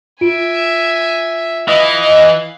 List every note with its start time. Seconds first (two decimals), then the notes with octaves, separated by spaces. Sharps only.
0.21 F4 E5 G#5 D7
1.68 E3 D#5 F5